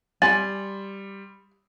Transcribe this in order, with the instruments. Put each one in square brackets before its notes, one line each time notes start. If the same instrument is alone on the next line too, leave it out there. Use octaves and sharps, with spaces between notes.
[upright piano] G3 C6 F#7 [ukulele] G#5 [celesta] A6